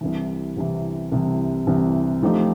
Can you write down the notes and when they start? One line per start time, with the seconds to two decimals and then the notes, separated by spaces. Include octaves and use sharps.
0.01 C2 C3 E3
0.57 C2 C3 E3
1.12 C2 C3 E3
1.67 C2 C3 E3
2.23 F3 A3 C4 D#4 G4